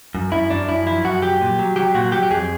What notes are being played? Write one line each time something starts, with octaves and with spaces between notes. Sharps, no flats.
F#2
F#2 E4
F#2 D4
F#2 E4
F3 E4
F#2 F#4
F#3 G4
A#2
F#3
F#3 G4
A#2 F#4
F#3 G4
G4
F2 G#4